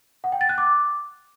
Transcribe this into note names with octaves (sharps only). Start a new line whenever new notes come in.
F#5
G5
A6
F#6
D6